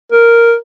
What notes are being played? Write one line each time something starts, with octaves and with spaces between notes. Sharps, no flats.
A#4